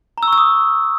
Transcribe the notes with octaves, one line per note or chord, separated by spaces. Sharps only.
A#5
E6
C#6
E6
D#6